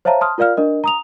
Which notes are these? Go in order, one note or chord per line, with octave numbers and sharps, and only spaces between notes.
C5 C#5 E5 F5 A5 A#5
A5 C6 D#6 F6
F4 A#4 D5 F5 F6
D4 A#4 D#5
A#5 D#6 F7